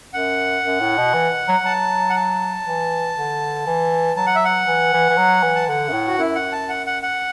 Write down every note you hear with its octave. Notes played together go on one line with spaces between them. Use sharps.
F#2 F#5
F#2
A2
B2
E3
F#3
F#3 A5
F#5
A5
E3
D3
E3
F#3 A5
F#5
E5
F#5
E3
E3
E3
F#3
E3
A5
D3 F#5
F#2
A2
F#4
F#2 E4
F#5
A5
F#5
F#5
F#5